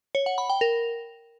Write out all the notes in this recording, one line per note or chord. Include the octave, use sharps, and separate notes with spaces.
C#5
F#5
B5
G5
A#4